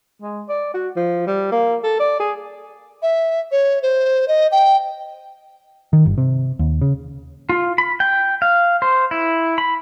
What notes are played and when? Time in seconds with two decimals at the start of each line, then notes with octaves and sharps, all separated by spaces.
0.22 G#3
0.49 D5
0.74 F#4
0.96 F3
1.27 G3
1.52 A#3
1.84 A4
2.00 D5
2.20 G#4
3.02 E5
3.51 C#5
3.82 C5
4.28 D#5
4.52 G5
5.93 D#3
6.06 G1
6.18 C3
6.59 D#2
6.81 C#3
7.49 F4
7.78 B5
8.00 G5
8.42 F5
8.82 C5
9.11 E4
9.58 B5